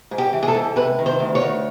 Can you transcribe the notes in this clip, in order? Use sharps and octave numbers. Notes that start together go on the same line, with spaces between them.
G#2
G4
E3
G#4
A4
G#2
C3 B4
D#3
C5
D2
C#5
D2